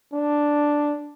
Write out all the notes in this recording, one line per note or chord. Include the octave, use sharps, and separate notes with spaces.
D4